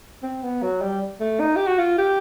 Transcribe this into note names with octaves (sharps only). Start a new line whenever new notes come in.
C4
B3
F#3
G3
A3
D#4
G4
F#4
F4
G4